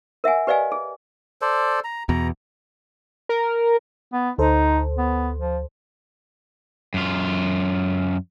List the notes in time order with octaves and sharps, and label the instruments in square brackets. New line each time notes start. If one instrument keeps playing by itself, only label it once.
[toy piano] A#4 E5 F#5 G#5
G4 B4 D5 D#5 F5 G#5
G#4
[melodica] A4 C5 D5
A#5
[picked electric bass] E2 B2 [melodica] A#5
[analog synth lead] A#4
[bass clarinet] B3
[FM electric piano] D2 A4 C5 [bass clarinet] D#4
[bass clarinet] B3
F3
[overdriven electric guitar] F#2 F4